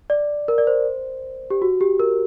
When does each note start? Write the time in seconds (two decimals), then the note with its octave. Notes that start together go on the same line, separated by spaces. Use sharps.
0.10 D5
0.48 A#4
0.58 D5
0.67 C5
1.50 G4
1.62 F#4
1.81 G4
2.00 A#4